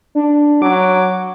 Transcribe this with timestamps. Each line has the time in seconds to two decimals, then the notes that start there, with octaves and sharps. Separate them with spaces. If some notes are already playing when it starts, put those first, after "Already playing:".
0.15 D4
0.62 F#3 D6